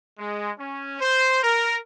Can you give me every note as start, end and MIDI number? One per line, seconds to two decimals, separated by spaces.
0.19 0.51 56
0.58 0.98 61
1.00 1.39 72
1.42 1.76 70